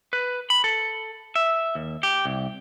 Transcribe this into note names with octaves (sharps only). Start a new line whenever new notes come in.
B4
B5
A4
E5
D#2
G4
C2